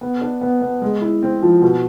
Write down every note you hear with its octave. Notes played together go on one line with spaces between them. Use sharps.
B3
D4
B3
B3
G#3
E4
C4
F3
B2